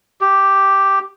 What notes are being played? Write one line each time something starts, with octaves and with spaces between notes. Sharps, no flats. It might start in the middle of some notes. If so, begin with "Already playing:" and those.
G4